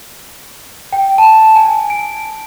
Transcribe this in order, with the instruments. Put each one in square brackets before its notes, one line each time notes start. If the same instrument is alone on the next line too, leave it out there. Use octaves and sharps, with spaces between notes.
[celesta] G5
A5
G#5
D7